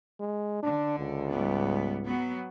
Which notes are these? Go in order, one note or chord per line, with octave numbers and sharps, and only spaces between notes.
G#3
D3 D4
C#2
G#2 G3 B3
F#3 B3